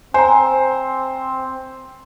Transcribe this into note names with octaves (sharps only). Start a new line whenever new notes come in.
C4 C5 G#5 A#5